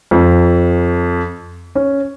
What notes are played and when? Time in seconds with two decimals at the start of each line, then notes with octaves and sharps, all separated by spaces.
0.11 F2
1.75 C#4